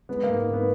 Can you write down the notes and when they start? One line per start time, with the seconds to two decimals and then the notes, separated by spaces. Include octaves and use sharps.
0.09 G#3 B3
0.23 A#3
0.29 G#2
0.48 G#2
0.53 B3